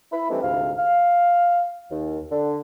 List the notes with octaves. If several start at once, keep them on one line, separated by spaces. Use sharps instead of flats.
E4 B5
E3 G3 A3 C4 D4 D#4
D2 G#2 C3 F5
F5
D#2
D3